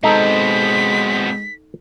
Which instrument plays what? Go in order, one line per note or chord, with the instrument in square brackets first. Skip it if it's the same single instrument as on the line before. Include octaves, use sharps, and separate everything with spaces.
[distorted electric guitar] B2 C4 [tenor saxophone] G#3 [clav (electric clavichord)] D#4 A4 [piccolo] B6